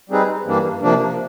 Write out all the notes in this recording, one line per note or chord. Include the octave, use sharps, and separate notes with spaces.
G3 C4 D#4 G#4 B4
G2 E3 G3 A#3 D4
C3 F3 A#3 D4